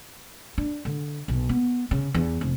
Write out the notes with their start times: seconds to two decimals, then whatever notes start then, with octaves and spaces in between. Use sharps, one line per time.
0.58 D4
0.85 D3
1.28 B1
1.49 B3
1.91 C#3
2.14 E2
2.41 F1